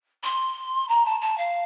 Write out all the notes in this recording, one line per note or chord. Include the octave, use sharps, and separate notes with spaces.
C6
A#5
A5
A5
F5